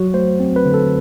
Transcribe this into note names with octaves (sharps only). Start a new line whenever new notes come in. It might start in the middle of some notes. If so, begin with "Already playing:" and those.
Already playing: F#3 F#4
A3 C5
C4
B4
D3
A4